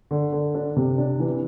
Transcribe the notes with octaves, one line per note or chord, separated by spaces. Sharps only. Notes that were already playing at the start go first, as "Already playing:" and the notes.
D3
D3
D4
C3
D4
E3